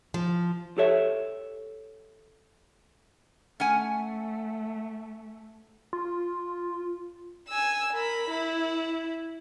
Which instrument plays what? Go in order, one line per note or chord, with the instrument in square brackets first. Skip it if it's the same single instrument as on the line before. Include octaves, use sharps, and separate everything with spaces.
[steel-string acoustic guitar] F3
[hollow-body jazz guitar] G4 A4 C#5 E5
[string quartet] A3 [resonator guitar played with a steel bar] C#4 F#5 G#5
[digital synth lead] F4
[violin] G#5 E6
A#4 B5
E4